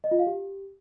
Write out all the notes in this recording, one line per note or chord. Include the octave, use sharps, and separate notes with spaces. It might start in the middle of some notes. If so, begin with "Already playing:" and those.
D#5
F4
F5
G4